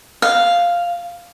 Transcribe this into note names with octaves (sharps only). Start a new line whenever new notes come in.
F5